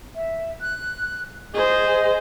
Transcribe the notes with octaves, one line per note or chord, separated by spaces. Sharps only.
E5
F#6
G#4 C5 D#5